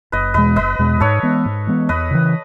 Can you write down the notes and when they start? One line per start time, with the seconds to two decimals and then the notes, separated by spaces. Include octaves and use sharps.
0.12 F#1 B4 D#5
0.34 E2 B2 G#3 B4 D#5
0.56 F#1 B4 D#5
0.79 E2 B2 G#3
1.00 G#2 A4 C#5
1.23 E3 G#3 B3
1.46 G#2
1.67 E3 G#3 B3
1.89 E2 B4 D#5
2.11 C#3 E3